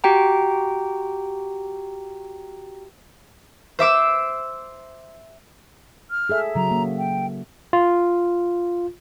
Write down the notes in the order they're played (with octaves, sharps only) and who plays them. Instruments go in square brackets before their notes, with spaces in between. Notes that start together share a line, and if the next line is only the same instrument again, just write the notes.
[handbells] F#4 G4 G5 A#5
[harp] C5 E5 D6 E6
[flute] F6
[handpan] G#4 A4 E5
[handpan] C#3 F#3 [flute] A#5
[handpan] A#3
[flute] G5
[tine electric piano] F4